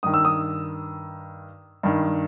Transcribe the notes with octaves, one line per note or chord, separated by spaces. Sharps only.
G2 D#3 D#6
E6
D#6
G2 D#3